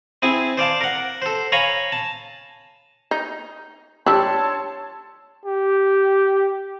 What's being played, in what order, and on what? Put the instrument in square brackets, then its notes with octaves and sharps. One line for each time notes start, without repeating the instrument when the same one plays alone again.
[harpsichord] C4 E4 G#4 G#5
C5 D5 F5 A5
A#4 F#5
A4 C5
C#5 F5 G#5 A#5 B5 C#6
A5
[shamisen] D#4
[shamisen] G3 D4 [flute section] C#5 A5 C6 [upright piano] E6
[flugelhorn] G4